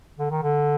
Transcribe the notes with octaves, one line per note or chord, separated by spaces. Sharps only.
D3
D#3
D3